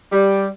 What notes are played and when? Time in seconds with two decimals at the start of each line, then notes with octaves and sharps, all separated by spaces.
0.12 G3